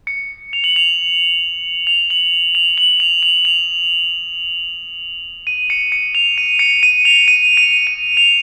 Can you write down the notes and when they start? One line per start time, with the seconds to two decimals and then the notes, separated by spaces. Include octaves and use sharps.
0.07 C#7
0.53 F7
0.64 F#7
0.76 F7
1.87 F7
2.10 F#7
2.55 F7
2.78 F#7
3.00 F7
3.23 F7
3.45 F7
5.47 D#7
5.70 C#7
5.92 C#7
6.15 F7
6.38 D#7
6.59 C#7
6.83 D#7
7.05 F7
7.28 D#7
7.57 D#7
7.87 D#7
8.17 F7